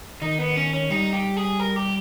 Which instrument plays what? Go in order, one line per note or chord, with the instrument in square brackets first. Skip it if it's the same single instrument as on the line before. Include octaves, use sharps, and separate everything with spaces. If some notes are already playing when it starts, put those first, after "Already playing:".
[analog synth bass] D#3 [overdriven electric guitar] D#4
[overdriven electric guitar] B3
C#4
C#4
[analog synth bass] G3 [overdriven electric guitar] D#4
[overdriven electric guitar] G4
G#4
A#4
G4